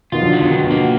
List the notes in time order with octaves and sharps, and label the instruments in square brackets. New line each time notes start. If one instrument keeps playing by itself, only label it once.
[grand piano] B2 D#3 [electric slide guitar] F4
[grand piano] D3 F3
[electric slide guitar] F#3
[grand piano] B2
[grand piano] D3 [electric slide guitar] D#3
[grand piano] B2
[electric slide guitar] A#3